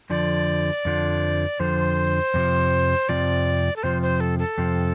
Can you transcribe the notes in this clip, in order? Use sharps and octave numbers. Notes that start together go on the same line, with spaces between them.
F2 D3 F3 D5
F2 D3 F3
F2 D3 F3 C5
F2 C3 F3
F2 C3 F3 D5
A4
F2 C3 F3 C5
C5
A4
A4
F2 C3 F3